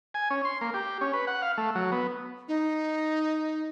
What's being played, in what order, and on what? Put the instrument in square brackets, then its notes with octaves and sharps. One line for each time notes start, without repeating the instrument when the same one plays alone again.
[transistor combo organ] G#5
C#4
C6
A#3
G4
C#4
B4
F#5
F5
A3
F#3
B3
[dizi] D#4